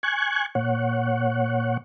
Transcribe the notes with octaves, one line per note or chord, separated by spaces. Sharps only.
G#5 C#6 F#6 G#6
A#2 C#5 F#5